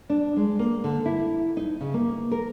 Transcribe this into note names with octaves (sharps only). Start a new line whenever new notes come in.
D4
G#3
A#3
D3
E4
D#4
C#3
A#3
A#4